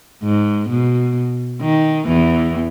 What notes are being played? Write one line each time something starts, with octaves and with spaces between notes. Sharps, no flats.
G#2
B2
D#3
E2 E3